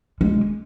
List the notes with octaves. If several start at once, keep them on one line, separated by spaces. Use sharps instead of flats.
G#3